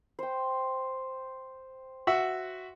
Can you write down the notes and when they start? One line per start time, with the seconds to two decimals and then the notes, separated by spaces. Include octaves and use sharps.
0.19 C5 G5
2.07 F#4 E5 F#5